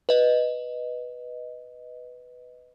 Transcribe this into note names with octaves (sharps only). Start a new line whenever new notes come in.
B4 D#5